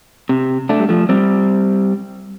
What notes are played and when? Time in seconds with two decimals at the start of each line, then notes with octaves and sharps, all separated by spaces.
0.29 C3
0.69 A3 D4
0.80 G3
0.89 F3 A3
1.09 G3 C4